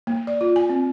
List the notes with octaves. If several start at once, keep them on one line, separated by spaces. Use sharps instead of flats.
A#3
D5
F4
G#5
C4